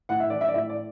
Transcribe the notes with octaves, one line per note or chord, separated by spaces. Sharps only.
A2 F#5
E5
E3 D5
E5
D5
A2 E5
D5